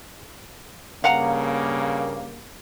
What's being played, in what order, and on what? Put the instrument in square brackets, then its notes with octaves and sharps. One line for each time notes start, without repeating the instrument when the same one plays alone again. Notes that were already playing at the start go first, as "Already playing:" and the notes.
[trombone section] G2 C#3 A#3 [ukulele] F5 F#5 A#5